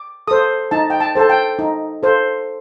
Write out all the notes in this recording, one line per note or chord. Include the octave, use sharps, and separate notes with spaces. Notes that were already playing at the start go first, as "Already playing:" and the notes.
Already playing: D6
A4 C5 D#6
D#4 A5
G5
A5
A4 C5 A5
G5
D#4
A4 C5